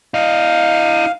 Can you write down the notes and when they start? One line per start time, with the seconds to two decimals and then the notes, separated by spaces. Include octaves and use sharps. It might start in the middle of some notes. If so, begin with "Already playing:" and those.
0.14 E4 D#5 F5